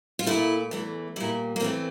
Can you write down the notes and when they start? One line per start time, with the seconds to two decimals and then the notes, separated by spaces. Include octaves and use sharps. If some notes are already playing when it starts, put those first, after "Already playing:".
0.19 F4
0.26 A#2 A3 E4
0.71 E2 E3 A3
1.16 A#2 G3 E4
1.56 A#3
1.60 E2 E3 A3 C4